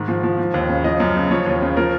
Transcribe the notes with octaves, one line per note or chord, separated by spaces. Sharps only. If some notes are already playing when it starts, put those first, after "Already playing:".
Already playing: G#2 D#3
F3
F3
F3
D#2
C#3
F3 D#5
F#2
C#3
F3 C#5
D#2
C#3
F3 A#4